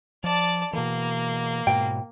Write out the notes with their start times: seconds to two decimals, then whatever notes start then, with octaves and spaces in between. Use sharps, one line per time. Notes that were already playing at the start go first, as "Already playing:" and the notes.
0.24 F3 D5 A5
0.73 B2 E3 A#3
1.67 G#2 B2 G5